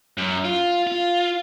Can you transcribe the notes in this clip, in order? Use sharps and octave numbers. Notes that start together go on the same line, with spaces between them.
F#2
F4
F4